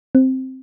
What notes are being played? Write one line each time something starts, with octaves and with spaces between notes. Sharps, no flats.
C4